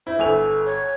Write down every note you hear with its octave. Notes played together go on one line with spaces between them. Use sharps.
E4 C5
G1 A4 G#5 F7
C#5